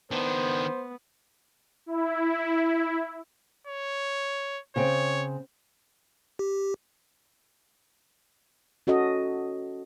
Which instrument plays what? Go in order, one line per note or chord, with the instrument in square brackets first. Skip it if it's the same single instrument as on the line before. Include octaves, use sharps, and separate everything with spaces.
[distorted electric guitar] D#3 D4 [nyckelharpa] B3 [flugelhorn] C5
[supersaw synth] E4
[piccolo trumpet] C#5
[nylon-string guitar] C#3 C4 G5 [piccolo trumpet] C#5
[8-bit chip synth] G4
[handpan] C#4 F#4 A4 D#5